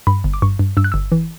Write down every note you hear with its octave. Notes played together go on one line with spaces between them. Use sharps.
G2 B5
G1
D6
G2 C#6
G2
G2 E6
F#6
G1 E6
E3